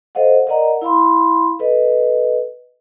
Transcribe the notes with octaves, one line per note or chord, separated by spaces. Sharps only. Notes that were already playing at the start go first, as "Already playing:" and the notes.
A4 C5 D#5 F5 F#5
A#4 D5 D#5 F#5 A#5
E4 F5 B5 C6
A4 B4 D#5